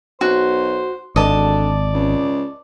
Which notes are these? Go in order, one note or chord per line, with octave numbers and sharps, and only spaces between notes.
B1 F#4 C5
G#1 D3 D5 D#5 A5
C#2